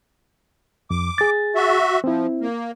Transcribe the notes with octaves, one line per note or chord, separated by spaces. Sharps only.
F2 D6
G#4 A6
F#4 E5
F3 C4 E4
A#3